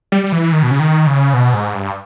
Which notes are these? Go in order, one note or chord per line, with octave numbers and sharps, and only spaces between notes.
G3
G3
E3
D#3
B2
C#3
D#3
C#3
B2
G#2
G2